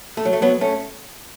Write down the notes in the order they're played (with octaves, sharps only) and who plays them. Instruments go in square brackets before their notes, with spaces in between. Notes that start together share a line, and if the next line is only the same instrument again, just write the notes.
[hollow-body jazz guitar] A3
F#3
A3
F#3 B3
A3 C#4